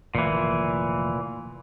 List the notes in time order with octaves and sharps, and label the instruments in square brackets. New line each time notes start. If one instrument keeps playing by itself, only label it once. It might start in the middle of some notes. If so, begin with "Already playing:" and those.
[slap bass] F1 D#3 A3 [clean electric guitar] A#2 E3